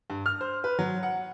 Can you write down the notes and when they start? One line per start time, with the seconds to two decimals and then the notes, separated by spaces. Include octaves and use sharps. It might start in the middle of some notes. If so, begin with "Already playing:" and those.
0.10 G2
0.26 F6
0.41 C5
0.64 B4
0.79 F#3
1.03 F#5